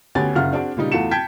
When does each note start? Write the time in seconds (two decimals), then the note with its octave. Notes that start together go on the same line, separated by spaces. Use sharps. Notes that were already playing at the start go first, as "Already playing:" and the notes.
0.15 D2 B3 C#4 G4 G#5 A6
0.35 F#1 C#3 F4 F#5 F6
0.52 C4 D4 F#4 G#4 D5
0.77 A#2 C#3 G3 D#4
0.92 E2 A3 F4 F#4 C#7 E7
1.11 G5 A5 G6 G#6 B6